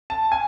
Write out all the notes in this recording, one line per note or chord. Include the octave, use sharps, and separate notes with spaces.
A5
G#5